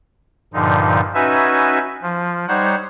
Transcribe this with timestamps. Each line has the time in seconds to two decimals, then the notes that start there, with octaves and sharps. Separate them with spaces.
0.54 G2 A#2 D3 F3 D#4
1.14 C#4 D#4 F#4 B4 E5 G#5
2.03 F3
2.48 G3 D#4 C5 C#5 F#5